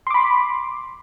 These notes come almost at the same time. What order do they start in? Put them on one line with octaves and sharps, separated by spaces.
C6 D6 B5